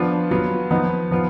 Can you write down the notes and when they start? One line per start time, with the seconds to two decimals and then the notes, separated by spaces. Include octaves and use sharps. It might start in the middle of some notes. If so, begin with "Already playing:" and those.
Already playing: F3 B3 D4 F4
0.31 F#3 B3 F4
0.71 F3 B3 D#4
1.11 F3 B3 F4